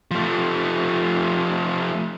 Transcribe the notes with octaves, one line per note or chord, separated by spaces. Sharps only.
F3 A3